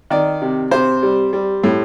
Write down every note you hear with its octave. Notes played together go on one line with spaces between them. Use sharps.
D#3 D5
C3
C3 C5
G3
G3
A2